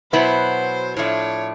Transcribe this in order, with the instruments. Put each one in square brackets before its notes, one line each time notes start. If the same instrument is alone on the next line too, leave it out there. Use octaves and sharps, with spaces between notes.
[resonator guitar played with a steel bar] B2 F#3 B3 E4 [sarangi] C5
[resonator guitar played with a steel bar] A2 F3 A3 D4 [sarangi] C#5